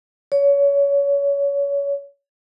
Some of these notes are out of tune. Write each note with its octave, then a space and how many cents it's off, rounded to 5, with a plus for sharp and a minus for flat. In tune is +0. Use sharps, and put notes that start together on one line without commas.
C#5 +25